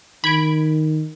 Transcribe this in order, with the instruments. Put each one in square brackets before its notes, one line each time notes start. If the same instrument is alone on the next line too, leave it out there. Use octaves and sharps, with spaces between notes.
[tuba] D#3 [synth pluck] B5 G#6 D7